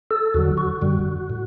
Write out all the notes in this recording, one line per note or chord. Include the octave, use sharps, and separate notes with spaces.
A4
E2 D3 F#3 F#4
F#4
F#2 D3 G3
A2